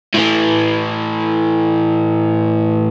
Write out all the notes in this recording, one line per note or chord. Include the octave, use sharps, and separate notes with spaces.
A2 E3